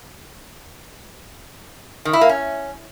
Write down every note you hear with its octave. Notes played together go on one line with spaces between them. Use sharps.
D#3
E4
A#3
C#4